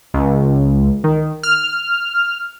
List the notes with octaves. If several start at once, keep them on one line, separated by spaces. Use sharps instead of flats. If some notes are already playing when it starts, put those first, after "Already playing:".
C#2
D#3
F6